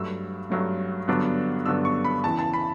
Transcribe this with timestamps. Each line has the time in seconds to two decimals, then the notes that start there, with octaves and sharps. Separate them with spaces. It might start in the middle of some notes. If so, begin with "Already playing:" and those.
Already playing: G2 F#3 A3 E6
0.50 G2 F#3 A3
1.08 G2 D3 F#3 B3 D4
1.66 G2 D3 F#3 B3 D4 E6
1.85 C#6
2.05 B5
2.24 E2 C#3 E3 A5
2.39 A5
2.54 B5